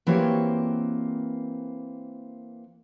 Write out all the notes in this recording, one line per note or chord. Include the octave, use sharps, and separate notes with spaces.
E3 A#3 C4 F#4 G4 C#5